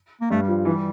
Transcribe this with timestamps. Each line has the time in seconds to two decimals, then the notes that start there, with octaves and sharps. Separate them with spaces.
0.21 A#3
0.30 G2 A3
0.42 G3
0.48 F3
0.65 E3 G3